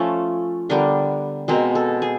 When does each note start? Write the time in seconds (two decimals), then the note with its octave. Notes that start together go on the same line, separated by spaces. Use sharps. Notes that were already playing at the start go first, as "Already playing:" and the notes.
Already playing: F3 A3 C#4 A4
0.69 D3 G3 B3 D4 A#4
1.48 B2 G#3 C4 A#4
1.75 A4
2.02 G#4